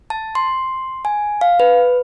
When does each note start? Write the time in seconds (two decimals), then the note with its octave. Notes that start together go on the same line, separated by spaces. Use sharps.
0.10 A5
0.35 C6
1.05 G#5
1.41 F5
1.60 B4